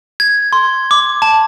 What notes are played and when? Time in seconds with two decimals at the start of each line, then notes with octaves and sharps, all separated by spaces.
0.20 G#6
0.53 C6
0.91 D6
1.22 A5